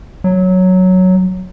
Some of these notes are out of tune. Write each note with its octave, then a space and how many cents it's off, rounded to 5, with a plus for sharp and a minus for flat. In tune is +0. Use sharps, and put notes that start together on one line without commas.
F#3 +0